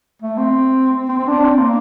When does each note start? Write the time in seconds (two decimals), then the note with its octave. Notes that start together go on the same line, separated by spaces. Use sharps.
0.22 A3
0.38 C4
1.09 C4
1.19 C4
1.28 D4
1.44 C4
1.59 A#3